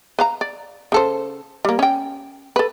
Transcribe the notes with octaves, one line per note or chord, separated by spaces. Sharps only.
B4 F5 A#5
D5
C#3 A4 C5
G3 A#3
C#4 G5
A4 B4